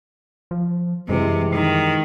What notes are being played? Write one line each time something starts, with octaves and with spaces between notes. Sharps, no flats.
F3
F#2 C3 E3 G3 G#3
D#3